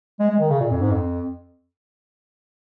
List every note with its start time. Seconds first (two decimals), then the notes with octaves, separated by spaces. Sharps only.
0.20 G#3
0.30 G#3
0.40 D#3
0.50 C#3
0.60 A#2
0.71 F2
0.81 G#2
0.91 F2